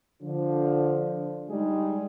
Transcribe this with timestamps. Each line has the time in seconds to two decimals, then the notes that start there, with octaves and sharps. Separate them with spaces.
0.23 D3 F3
1.50 G3 G#3 D#4 G#4